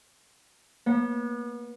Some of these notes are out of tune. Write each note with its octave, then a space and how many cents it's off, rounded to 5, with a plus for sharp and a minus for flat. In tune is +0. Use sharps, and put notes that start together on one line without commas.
B3 -35